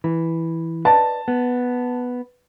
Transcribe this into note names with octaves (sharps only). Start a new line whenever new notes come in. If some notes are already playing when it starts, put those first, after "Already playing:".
E3
B4 D5 D#5 A5
B3